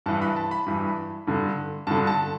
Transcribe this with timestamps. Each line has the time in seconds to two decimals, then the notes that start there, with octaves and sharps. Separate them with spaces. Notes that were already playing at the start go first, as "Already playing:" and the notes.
0.06 G2 E3 A5
0.22 B5
0.36 A5
0.51 B5
0.66 G2 E3
1.27 G2 D3
1.87 G2 A5
1.91 D3
2.07 A5